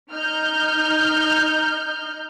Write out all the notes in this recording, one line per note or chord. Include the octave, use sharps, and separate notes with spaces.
D#4 F6 G6